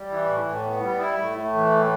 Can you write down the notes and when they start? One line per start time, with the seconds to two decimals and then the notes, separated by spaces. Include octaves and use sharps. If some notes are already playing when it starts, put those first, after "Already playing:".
Already playing: G3
0.09 E3
0.27 A2
0.45 A2
0.64 B3
0.81 G3
1.00 E4
1.18 A2
1.36 A3
1.54 E3
1.72 A2